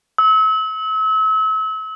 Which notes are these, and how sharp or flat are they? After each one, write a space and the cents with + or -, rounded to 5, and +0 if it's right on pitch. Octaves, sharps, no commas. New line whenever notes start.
E6 -35